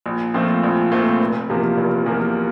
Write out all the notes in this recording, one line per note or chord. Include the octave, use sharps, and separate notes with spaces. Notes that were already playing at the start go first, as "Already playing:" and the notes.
A#1
A#2 F3 A3 C4
A#1
A#2 F3 A3 C4
F1
E2 C3 F3 A#3
F1
E2 C3 F3 A#3